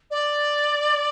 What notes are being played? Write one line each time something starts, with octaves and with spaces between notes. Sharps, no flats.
D5